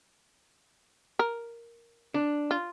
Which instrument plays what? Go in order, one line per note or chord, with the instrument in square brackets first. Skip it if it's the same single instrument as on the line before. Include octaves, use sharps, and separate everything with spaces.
[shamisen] A#4
[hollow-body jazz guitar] D4
[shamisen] F4